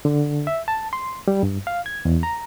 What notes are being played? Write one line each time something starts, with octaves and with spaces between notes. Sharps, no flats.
D3
E5
A5
C6
G3
G2
F5
G#6
E2
A#5